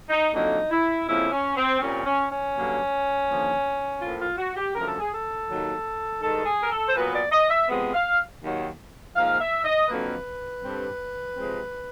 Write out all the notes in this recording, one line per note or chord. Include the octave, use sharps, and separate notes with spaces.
D#4
F2 D3 F#3 A#3 D#4
E4
F2 C#3 F3 A#3 E4
C#4
C4
A#2 G3 C4 C#4
C#4
C#4
G2 D3 F#3 A#3
D#2 D3 F3 A#3
A2 F3 A#3 F4
F4
F#4
G4
F#2 D3 F3 A3 A#4
A4
G#4
A4
D#2 D#3 F#3
G2 D#3 G#3 A4
G#4
A#4
A4
C5
A#2 F#3 B3 B4
D5
D#5
E5
C3 F3 G#3 B3
F5
D#2 D#3 F#3
G#2 F3 A#3 F5
E5
D#5
F2 D3 F#3 A#3 B4
G2 D3 G3 C4
C3 F3 G#3 C4